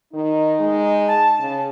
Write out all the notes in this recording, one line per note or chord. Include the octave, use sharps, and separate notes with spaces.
D#3 D#4
G#3
A5
C#3